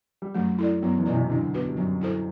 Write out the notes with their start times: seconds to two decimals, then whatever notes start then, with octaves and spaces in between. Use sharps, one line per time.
0.22 G3
0.35 F#2 F#3 A3
0.59 E4 A4 D5
0.82 F#2 F#3 B3
0.98 E2 E3
1.06 B2 E4 B4 D5
1.14 C2 C3
1.29 D2 D3 F#3
1.54 B3 F#4 B4
1.69 G3
1.77 F#2 F#3 C4
2.01 E4 A4 C5